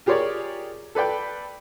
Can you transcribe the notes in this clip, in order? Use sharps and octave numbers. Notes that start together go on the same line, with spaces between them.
F4 G4 G#4 A#4 C#5 D5
A4 B4 D5 G5